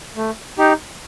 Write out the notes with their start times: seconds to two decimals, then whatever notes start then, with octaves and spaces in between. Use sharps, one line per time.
0.16 A3
0.58 D#4 G4